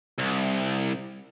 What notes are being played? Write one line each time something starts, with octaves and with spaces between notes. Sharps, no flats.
C2